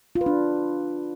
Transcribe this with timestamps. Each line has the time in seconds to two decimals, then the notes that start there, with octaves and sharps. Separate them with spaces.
0.15 F4
0.21 B4
0.26 D4